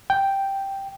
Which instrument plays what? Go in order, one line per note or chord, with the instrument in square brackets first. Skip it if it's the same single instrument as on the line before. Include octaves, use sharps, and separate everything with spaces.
[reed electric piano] G5